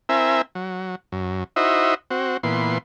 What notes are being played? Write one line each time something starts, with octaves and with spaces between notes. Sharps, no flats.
C4 E4 A#4 E5 G#5
F#3
F#2
D#4 E4 F#4 C5 D#5 E5
C4 F#4
A#2 E3 B3 C6